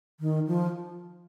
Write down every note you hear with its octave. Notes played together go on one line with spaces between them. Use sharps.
D#3
F3